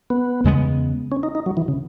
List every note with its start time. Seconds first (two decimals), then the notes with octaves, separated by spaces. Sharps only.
0.10 B3
0.44 E2 C#3 G#3 B3
1.12 C#4
1.23 D#4
1.35 D#4
1.46 F#3
1.57 E3
1.68 C#3